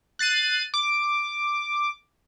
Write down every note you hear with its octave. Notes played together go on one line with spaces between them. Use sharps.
F#6 A6 C7 D#7
D6